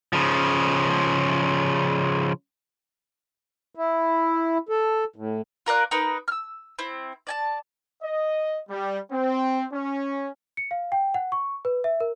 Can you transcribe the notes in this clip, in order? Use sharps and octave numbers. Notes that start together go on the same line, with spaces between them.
C#3 F3
E4
A4
A2
F4 A#4 D5 F#6
D#4 A#4 B4
E6 F6
C4 E4
D5 G#5 A5
D#5
G3
C4
C#4
C#7
F5
G5
F#5
C#6
B4
E5
A#4